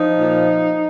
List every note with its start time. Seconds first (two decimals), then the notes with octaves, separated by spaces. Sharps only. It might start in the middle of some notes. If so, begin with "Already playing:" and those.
Already playing: F3 D#4
0.19 A#2